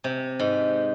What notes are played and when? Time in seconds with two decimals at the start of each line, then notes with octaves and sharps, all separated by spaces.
0.04 C3
0.39 G#2